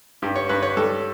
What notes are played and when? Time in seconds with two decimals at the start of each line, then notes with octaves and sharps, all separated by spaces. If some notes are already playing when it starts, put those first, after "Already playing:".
0.22 G2 G4
0.36 C#5
0.49 G2 B4
0.63 C#5
0.77 G3 A4